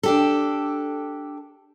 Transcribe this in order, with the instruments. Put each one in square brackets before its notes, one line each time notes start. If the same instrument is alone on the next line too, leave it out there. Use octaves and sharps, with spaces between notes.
[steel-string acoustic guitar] D4 G4 A4